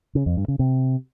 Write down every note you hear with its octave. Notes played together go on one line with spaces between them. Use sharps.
C#3
F2
G2
C#3
C3